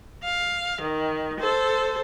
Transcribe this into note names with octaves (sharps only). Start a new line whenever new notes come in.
F5
D#3
A4 C5